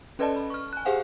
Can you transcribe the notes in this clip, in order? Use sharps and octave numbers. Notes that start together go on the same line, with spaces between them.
C#4 A4 B4 D5 D#5 A5
B5
C#6 F6
G#5 F#6
G4 G#4 C5 F5 F#5 G#5